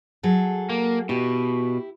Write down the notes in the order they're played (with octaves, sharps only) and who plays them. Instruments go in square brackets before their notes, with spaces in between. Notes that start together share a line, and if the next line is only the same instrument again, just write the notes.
[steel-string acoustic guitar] F#3 G#4 A4
[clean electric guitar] A#3
[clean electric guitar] B2 [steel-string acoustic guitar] E4 G4